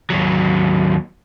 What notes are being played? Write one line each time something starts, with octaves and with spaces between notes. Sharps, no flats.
D#2 F#3